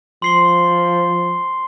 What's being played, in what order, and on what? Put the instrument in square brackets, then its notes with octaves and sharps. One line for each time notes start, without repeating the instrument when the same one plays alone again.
[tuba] F3 [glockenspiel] C6 C7 G7